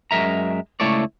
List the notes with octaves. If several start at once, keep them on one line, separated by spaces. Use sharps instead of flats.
F#2 G#3 A#4 E5 A#5
C#2 A3 E4 A4 C#5 D5